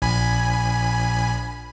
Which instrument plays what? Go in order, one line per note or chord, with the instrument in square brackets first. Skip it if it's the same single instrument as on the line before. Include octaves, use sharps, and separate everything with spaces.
[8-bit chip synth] A#1 G#5 B5